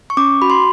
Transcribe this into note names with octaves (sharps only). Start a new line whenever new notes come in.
C#6
C#4 D6
F#4 B5
C6